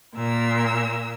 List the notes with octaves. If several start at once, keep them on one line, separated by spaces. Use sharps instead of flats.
A#2 A#4 E6